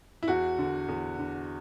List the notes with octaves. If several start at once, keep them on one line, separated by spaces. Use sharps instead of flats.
E4
E2 F#4
D3
E2
D3